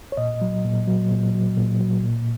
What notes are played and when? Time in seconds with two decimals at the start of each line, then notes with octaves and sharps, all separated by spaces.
0.12 C#5
0.17 A#2 D#5
0.41 F#3
0.65 A#2
0.87 F#3
1.11 A#2
1.34 F#3
1.57 A#2
1.80 F#3
2.04 A#2